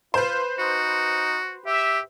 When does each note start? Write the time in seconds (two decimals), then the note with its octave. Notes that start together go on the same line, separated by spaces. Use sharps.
0.14 F4 B4 C5
0.59 D#4 F#4
1.66 G4 E5